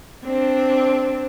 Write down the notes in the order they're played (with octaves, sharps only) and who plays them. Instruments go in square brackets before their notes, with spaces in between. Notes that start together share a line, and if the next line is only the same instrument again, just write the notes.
[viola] C4 D4